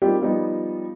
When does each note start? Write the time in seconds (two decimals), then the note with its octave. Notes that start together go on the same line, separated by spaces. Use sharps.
0.02 G3 A#3 C4 D#4 F4 G4
0.21 F3 G3 B3 D#4 F4